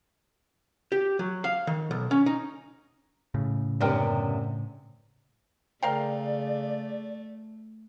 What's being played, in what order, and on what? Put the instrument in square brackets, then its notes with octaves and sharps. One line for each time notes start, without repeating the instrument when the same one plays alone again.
[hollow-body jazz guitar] G4
F#3
F5
D#3
B1
C#4
D#4
[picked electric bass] A2 C#3
[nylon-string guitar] F#2 C3 B3 [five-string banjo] D4 A#4 G5
[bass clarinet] C#3 [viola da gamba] A3 [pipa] A#4 F5 G5 [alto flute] D5